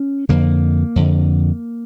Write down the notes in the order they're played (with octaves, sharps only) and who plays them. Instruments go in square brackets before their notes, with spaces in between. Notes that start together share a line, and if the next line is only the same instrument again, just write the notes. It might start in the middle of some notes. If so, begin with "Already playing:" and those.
Already playing: [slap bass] C#4
F2 D3 A#3
F2 D3